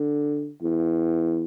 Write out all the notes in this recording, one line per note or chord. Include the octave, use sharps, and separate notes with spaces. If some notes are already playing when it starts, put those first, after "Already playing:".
Already playing: D3
E2